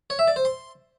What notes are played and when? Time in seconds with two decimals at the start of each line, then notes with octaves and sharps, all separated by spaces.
0.10 C#5
0.19 E5
0.28 D5
0.36 C5
0.45 C6